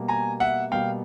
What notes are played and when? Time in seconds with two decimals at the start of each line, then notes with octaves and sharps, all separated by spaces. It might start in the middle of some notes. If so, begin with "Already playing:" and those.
Already playing: B2 G3 A#3
0.08 G#5 A#5
0.40 E5 F#5
0.72 B2 G3 A#3 F5 G5